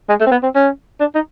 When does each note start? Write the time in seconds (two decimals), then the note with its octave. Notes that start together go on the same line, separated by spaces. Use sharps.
0.09 G#3
0.20 A3
0.27 C4
0.31 B3
0.43 C4
0.55 C#4
1.00 D4
1.15 D#4